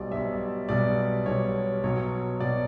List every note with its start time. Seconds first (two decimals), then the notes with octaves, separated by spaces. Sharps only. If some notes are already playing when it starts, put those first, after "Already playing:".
Already playing: B1 B2 G3 D5
0.11 B1 B2 G3 E5
0.69 B1 B2 G3 D5
1.26 B1 B2 G3 C#5
1.83 B1 B2 F#3 C#5
2.40 B1 B2 F#3 D5